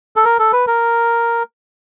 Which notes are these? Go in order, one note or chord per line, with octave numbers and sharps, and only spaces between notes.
A4
A#4
A4
B4
A#4